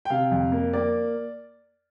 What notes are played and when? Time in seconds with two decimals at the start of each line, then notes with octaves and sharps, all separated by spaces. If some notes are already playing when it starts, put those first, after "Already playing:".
0.05 G5
0.10 C3 F5
0.31 F2
0.52 A#3
0.73 A#3 D5